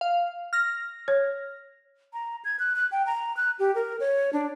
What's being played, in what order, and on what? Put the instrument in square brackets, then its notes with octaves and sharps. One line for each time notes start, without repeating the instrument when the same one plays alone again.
[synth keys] F5
F6 A#6
[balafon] C#5
[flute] A#5
G#6
F#6
F#6
G5
A#5
F#6
G4
A#4
C#5
D4